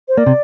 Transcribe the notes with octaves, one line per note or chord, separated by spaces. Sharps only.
C5
A#3 D5
C3